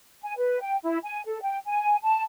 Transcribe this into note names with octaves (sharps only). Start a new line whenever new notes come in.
G#5
B4
G5
E4
G#5
A4
G5
G#5
A5